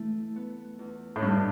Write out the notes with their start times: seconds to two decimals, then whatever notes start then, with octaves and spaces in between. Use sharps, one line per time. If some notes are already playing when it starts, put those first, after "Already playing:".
Already playing: E3 A3 E4
0.36 B3
0.79 E2
1.16 A2
1.22 G2 G3